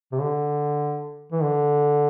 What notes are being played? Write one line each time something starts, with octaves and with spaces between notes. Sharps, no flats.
C3
D3
E3
D3